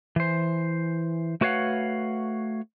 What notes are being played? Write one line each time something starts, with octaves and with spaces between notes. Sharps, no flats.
E3 C5
A3 F#4 B4 C#5 F5 F#5